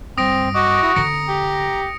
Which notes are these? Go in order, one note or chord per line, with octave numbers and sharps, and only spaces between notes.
G2 C4 D#6 A#6 D7
F#4 D#5 D6
E4 D#6
D3 C4 A#5 A#6 C#7 D7
G4